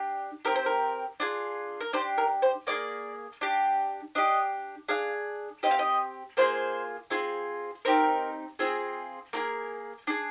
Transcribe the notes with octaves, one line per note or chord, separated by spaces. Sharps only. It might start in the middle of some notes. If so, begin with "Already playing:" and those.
Already playing: D4 G4
C4 G4 A#4
C5
A#4
D4 F4 G#4
A#4
D4 G4 C5
A#4
C5
A#3 F4 G#4 D5
D4 G4
D4 G4 D#5
D4 G#4 F5
C4 G4 D#5
F5
D#5
A#3 F4 G#4 C5
C4 F4 G#4
C4 D#4 G4 A#4
C4 F4 G#4
A#3 F4 G#4 A#4
D4 G#4